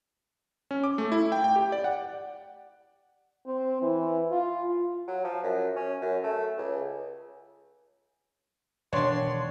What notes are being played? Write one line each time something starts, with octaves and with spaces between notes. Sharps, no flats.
C#4
D6
A3
E4
G5
G5
G4
D5
F#5
C4
E3
F4
F#3
F3
F#2
C#4
F#2
A3
C#2
E1 D#3 D4 C#5 C6